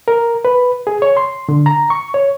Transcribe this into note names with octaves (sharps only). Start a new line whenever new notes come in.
A#4
B4
G#4
C#5
C6
D3
A#5
C#6
C#5